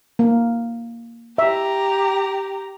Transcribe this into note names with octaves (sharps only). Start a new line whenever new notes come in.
A#3
G4 E5 A#5